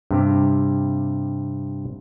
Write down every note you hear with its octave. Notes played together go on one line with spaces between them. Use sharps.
G2 C3 G4